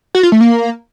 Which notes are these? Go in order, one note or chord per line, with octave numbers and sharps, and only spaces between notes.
F#4
F4
A3
A#3